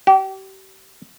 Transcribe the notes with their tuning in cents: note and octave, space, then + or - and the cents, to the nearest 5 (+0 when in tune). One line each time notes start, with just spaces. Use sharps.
G4 -35